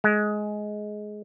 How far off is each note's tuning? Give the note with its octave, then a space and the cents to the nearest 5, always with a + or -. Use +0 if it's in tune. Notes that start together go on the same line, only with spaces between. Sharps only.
G#3 +15